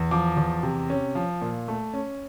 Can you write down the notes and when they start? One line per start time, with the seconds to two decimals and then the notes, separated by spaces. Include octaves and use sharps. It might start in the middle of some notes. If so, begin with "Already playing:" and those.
Already playing: E2
0.11 F3 D6
0.37 E2
0.63 C3
0.90 C#4
1.15 F3
1.41 A#2
1.68 A3
1.94 C#4